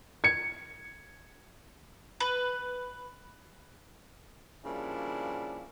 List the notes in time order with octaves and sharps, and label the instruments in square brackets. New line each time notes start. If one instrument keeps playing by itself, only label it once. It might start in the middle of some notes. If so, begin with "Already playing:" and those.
[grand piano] G#6 C#7
[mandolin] B4
[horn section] C#3 F3 G3 A#3 D4 E4